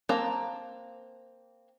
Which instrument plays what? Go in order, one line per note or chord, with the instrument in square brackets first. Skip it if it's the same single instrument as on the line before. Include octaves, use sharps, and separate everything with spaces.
[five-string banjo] A#3 C4 A5 A#5